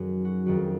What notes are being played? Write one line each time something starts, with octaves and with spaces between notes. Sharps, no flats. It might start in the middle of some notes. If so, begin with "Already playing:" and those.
Already playing: F#2 D#3 F#3
F#4
F2 D#3 F#3 F#4